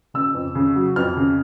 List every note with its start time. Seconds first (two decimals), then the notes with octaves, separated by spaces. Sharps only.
0.14 C#3 E6
0.34 F2
0.55 C#3
0.76 F#3
0.96 F2 F6
1.17 C#3